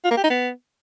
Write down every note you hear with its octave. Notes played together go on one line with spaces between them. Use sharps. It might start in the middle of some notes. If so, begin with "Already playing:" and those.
F4
A#3
G4
D#4
B3